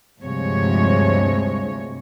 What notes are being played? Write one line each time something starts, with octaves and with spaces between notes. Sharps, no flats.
D2 G2 C3 F3 G#3 C#5